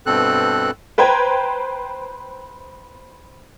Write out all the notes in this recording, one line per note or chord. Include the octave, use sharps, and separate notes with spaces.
G2 B2 C4 A4 F#6
B4 C5 G5 A#5 G#6